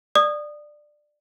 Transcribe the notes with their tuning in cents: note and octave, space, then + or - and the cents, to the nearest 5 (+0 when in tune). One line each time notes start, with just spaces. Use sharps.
D5 +15 D#6 -20